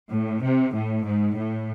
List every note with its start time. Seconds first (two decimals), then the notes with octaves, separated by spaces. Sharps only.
0.11 A2
0.42 C3
0.74 A2
1.06 G#2
1.37 A2